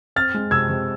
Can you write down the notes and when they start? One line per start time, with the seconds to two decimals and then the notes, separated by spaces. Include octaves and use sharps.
0.16 C4 F6 A6
0.34 G#3
0.51 C3 E6 G#6
0.69 C3